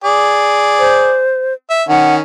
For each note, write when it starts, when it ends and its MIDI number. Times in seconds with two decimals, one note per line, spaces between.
0.04 1.23 68
0.04 1.23 74
0.79 1.54 72
1.70 1.83 76
1.89 2.20 51
1.89 2.20 61
1.89 2.15 78